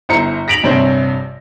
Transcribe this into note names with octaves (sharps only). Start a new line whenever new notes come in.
G1 E4 C5 A#5 C#7
A#6 B6 D7 F7 F#7
A#1 G2 C3 C5 C#5 A#6